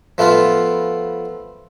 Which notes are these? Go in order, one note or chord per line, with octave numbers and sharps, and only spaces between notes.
F3 A3 B3 F4